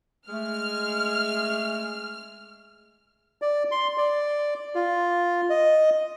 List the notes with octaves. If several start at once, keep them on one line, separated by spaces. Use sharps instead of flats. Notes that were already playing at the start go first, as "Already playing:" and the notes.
G#3 A3 F6
D5
C6
D5
F4
D#5